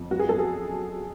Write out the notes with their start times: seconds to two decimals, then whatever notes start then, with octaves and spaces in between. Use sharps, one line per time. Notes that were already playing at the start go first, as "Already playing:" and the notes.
Already playing: F2
0.11 F#2 F#4
0.19 G#4
0.29 F#2 A4
0.39 G#4